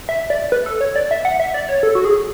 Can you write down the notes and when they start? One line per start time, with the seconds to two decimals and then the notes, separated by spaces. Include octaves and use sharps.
0.09 E5
0.30 D5
0.52 B4
0.66 A4
0.81 C#5
0.96 D5
1.11 E5
1.25 F#5
1.40 E5
1.54 D5
1.69 C#5
1.83 A4
1.95 F#4
2.05 G#4